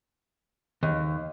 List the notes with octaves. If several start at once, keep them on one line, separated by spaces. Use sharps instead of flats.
D#2